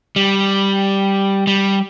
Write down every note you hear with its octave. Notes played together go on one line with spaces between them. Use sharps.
G3
G3